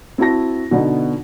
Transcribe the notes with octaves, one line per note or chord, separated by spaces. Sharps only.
C4 E4 F#4 A5 A#6
B2 D3 B3 D#4